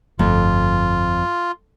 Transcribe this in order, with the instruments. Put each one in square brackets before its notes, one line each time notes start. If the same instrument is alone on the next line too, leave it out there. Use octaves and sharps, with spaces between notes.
[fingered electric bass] G1 A3 [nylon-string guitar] F2 [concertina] F4